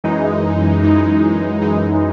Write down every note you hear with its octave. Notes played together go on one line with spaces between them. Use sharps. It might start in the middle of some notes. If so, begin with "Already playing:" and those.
F#2 E3 G#3 D#4
F#2 E3 G#3 D#4
F#2 E3 G#3 D#4